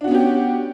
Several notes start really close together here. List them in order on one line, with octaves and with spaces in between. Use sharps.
D4 F#4 B3 C#4 G4